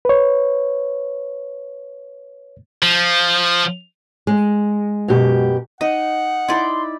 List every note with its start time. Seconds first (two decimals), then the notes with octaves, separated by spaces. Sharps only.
0.05 B4 C#5
2.82 F3
4.27 G#3
5.08 F#2 B2 G4
5.81 D#4 D#5 F#5
6.48 D#4 E4 D5 B5 C6